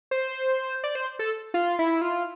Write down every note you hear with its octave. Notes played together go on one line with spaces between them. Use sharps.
C5
D5
C5
A4
F4
E4
F4